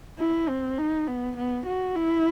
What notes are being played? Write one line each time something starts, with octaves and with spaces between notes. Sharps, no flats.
E4
C4
D#4
B3
B3
F#4
E4